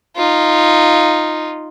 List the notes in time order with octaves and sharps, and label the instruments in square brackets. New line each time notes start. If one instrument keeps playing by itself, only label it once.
[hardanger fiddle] D#4 F4